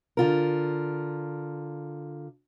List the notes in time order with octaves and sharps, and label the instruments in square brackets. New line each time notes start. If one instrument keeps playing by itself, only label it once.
[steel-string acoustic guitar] D3 F4 A#4